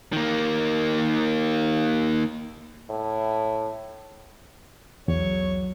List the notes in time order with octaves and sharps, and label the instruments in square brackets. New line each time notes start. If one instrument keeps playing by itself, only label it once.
[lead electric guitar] D#3 A#3
[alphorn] A2
[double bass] B1 F#3 [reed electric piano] E2 [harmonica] C#5